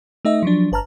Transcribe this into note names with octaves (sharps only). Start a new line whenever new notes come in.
A3 D#4 D#5 E5
F3 F#3 D4
G1 B4 A5 A#5 F6